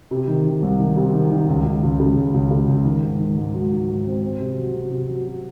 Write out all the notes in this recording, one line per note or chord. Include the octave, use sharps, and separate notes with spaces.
C3
D#3
D#3
C2
D#3
C3
D#3
D#3
C#2
C#2
C#2
C#3
C#2
C#2
C#3
C#2
D#3
G#2
D#3
G#2
F#3
G#2
G#2
C4
C4
C3
F#3
C3
C3
F#3
F#3